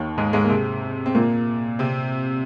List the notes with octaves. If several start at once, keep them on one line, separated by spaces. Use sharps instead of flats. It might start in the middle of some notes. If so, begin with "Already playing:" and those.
Already playing: D#2 D#3
G#2 G#3
G#2 G#3
A#3
C3 C4
C4
A#2 A#3
C3 C4